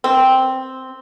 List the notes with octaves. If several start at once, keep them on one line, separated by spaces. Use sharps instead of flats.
C4